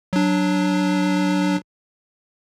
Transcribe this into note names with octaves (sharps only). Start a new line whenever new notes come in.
F#3 D4